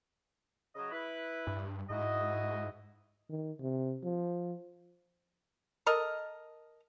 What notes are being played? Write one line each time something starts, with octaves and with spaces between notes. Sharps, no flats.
C#3 F#3 D#5
E4 B4
G2
G#2 E4 F#4 D#5
D#3
C3
F3
A4 A#4 D#5